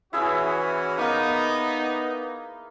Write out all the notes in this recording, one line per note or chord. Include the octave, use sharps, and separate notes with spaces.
E3 C#4 E4 F#4 G#4 E5
A#3 B3 D#4